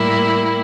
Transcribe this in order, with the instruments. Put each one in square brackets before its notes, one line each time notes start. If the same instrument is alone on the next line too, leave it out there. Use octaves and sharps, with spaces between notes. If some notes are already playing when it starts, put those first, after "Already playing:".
Already playing: [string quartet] A2 G3 A#3 E4